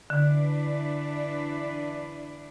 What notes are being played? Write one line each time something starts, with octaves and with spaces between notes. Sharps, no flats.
D3 E3 D4 B4